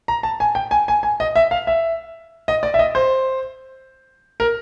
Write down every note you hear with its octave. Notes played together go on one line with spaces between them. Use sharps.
A#5
A5
G#5
G5
G#5
G#5
G#5
D#5
E5
F5
E5
D#5
D5
E5
D#5
C5
A#4